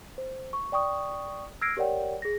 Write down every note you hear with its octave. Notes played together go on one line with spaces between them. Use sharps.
C5
C#6
D5 G5 C#6 D#6
E6 F6 G#6 A#6 C7 D7
G4 A#4 C#5 D5 F#5 G5
G#4 A#6